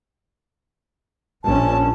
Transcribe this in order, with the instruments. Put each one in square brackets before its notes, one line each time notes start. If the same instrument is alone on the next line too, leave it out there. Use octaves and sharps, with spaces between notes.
[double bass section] A#1 C#4 [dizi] A5